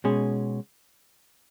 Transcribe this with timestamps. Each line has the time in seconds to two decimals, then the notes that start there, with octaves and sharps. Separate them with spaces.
0.04 B2 G#3 C#4 G#4